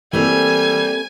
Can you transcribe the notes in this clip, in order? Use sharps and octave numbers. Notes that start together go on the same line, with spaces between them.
E3 G3 A3 A#3 C4 G#5